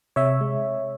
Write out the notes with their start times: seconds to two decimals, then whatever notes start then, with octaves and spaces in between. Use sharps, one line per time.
0.16 C3 C#5 E5
0.41 G#3